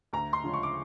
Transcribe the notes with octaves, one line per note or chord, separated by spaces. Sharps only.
D2 A#5
C6
C#3 F3 G#3 C#4
C#6
D6